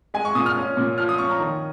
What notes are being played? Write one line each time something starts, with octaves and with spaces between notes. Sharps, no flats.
G#3 G#5
C#6
A#2 D#6
F6
C#4
A#2
F3 F6
D#6
C#4 C#6
A#5
D#3